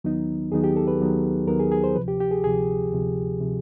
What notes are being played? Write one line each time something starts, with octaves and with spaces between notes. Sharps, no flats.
D#2 D#3 F#3 B3 D#4
D#2 D#3 F#3 B3 D#4 G#4
G4
A4
B4
D#2 D#3 F#3 B3 D#4
D#2 D#3 F#3 B3 D#4 A#4
G#4
G#4
C5
D2 C3 F3 B4
G4
G4
G#4
D2 C3 F3 G#4
D2 C3 F3
C3 F3